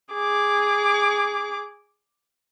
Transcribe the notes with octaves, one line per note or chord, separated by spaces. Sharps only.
G#4 D6